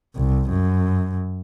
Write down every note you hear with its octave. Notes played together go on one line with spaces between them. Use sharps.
C2
F#2